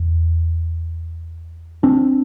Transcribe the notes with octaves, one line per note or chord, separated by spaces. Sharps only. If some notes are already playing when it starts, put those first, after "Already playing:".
Already playing: E2
C4 D4